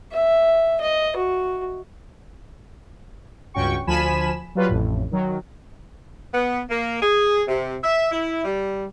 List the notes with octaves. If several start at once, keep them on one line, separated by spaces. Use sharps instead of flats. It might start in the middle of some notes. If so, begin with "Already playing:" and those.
E5
D#5
F#4
C#2 G2 C#4 F#4 G5 C#6
D2 F3 G#5 B5 B6 E7
F#3 G3 F4 B4
A1 F2 A2
D#3 F#3
B3
A#3
G#4
C3
E5
E4
G3